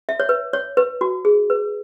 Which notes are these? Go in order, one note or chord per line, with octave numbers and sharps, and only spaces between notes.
E5
C#5
B4
C#5
B4
F#4
G#4
B4